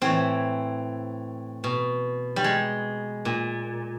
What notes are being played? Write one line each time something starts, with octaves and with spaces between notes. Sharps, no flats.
A2 E3 C4
B2
G3
G#3
A#2